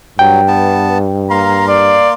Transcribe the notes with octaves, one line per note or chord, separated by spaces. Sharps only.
G2 F#3 G5
B3 A5
A#3 F5 A#5 C6
D5